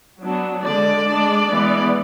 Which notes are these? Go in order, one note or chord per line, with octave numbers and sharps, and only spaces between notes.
F#3 B3 D4
D3 G#3 D4 D5
G#3 D4
E3 G#3 B3